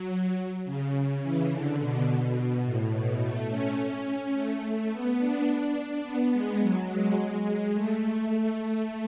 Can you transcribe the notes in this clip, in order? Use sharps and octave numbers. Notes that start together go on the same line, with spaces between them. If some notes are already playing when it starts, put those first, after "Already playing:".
Already playing: F#3
C#3
C#3
E3
D3
B2
A2
B2
A3
C#4
C#4
A3
B3
D4
D4
B3
G#3
F#3
G#3
A3